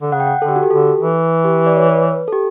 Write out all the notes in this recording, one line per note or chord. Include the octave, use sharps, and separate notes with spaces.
D3
C#3 F#5
G5
F#5
D3 A4
G4
F#4
G4
D3 A4
E3
G4
D5
C#5
B4
A4
G4